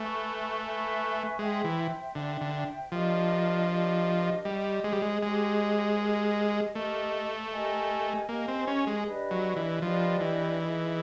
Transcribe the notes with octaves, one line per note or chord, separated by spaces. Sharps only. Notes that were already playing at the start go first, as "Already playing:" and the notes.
Already playing: A3 B4 E5 G#5 C#6
B4 E5 G#5 C#6
G#3 C5 E5 G5
E3
D3 C5 E5 G5
D3
F3 D4 G4 A#4 D#5
D4 G4 A#4 D#5
G3 G4 C5 D#5
G#3
G3
G#3
G#3 G4 C5 D#5
G4 A#4 D#5
A3 G4 A#4 D#5
G4 A#4 D#5 G#5
A#3 G4 A#4 D#5 G#5
C4
C#4
G#3
D4 G4 B4 D#5
F#3
E3
F3 D4 G4 B4 D#5
E3
D#4 G#4 B4 D#5